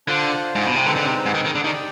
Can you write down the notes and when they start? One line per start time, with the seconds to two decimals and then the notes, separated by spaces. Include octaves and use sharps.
0.07 D3 D4 F4 C5
0.55 G#2
0.66 B2
0.76 C3
0.86 D3 G#3 C4 D#4 B4
0.96 D3
1.06 C3
1.26 G#2
1.35 D#3
1.45 D#3
1.55 D3
1.64 D#3 D4 G4 D5 G5